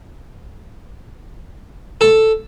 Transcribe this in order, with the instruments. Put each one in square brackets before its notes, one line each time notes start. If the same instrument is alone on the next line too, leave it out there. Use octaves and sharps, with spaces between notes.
[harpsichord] A4